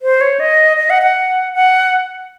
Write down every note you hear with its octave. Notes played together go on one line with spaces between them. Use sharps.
C5
C#5
D#5
D#5
F#5
F#5
F#5